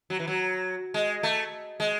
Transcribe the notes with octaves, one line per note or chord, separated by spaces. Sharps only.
F#3
E3
F#3
G#3
A3
G#3